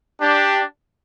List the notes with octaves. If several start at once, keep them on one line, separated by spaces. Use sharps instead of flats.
D4 G4